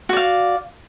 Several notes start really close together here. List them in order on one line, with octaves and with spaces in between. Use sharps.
F#4 D5 F5